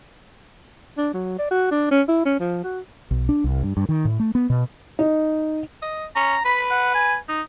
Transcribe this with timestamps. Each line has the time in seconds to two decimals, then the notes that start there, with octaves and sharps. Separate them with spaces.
0.98 D4
1.14 F#3
1.39 D5
1.51 F#4
1.71 D4
1.91 C#4
2.08 E4
2.25 C#4
2.40 F3
2.64 F#4
3.11 B1
3.29 D4
3.44 C2
3.63 G2
3.77 G2
3.89 D#3
4.05 A2
4.20 A3
4.35 B3
4.50 B2
4.99 D#4
5.82 D#5
6.16 C#4 A#5
6.45 B4 B5
6.70 F#5
6.95 G#5
7.28 D#4